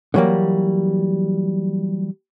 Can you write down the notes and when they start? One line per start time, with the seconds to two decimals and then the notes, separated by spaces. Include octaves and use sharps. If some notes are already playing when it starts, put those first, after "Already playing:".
0.14 D3 E3 F#3 G3 A#3